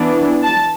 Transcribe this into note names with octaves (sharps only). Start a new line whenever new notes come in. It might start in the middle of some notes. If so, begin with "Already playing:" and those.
Already playing: E3 B3 D4
A5